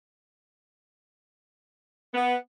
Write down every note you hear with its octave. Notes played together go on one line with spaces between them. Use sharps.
B3